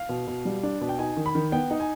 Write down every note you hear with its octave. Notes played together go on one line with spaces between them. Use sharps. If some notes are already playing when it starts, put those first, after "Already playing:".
Already playing: F5
B2
B2
G3
D4
B2
G5
D#4 G#5
D#3
B5
D#3
B3 G5
D#4
G#5